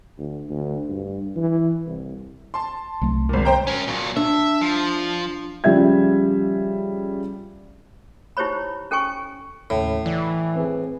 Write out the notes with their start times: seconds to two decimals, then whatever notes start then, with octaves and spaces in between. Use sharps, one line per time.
0.18 D2
0.49 D2
0.89 G2
1.36 E3
1.86 C2
2.54 A5 C6
3.01 C2 F#3 A3
3.29 G#1 A#2
3.45 C5 G5 A#5
3.67 C#4 A#4
3.87 A#2 F#3
4.16 D4 E5
4.61 F3
5.64 C#3 F3 G3 E5 G#6
8.37 D#4 E4 G4 C5 C#5 B5
8.91 C#4 A4 G5 G#5 C#6
9.70 D#2 A2 C#3 C#5
10.06 E3 D5
10.56 C4 G#4 B4